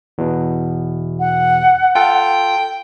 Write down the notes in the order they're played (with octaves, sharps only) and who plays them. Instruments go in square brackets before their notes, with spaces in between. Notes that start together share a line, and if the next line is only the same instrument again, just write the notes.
[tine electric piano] E2 B2
[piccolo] F#5
[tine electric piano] F4 A4 [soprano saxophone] G5